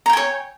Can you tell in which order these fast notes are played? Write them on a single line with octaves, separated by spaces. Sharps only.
A#5 G5 G#5 C#5